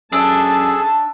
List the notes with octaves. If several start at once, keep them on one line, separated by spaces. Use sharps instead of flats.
F#2 D4 G#4 A4 E5 A5